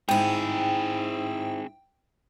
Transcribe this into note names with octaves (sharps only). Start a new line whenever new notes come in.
G#2 C4 E4 G#4 G5